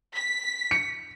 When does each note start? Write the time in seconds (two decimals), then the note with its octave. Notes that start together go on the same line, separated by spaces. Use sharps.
0.16 B6
0.71 C#7